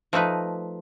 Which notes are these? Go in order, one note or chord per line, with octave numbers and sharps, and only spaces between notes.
F3 A3 D#4 B4